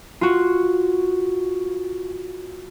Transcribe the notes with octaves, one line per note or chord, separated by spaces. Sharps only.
F4 F#4